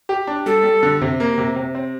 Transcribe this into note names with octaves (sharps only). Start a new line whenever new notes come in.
G4
D4
G3 A4
G3
D3
C3
A#3
C3
C3
C4